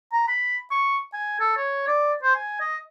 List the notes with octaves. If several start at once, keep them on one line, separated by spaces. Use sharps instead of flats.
A#5
B5
C#6
G#5
A4
C#5
D5
C5
G#5
D#5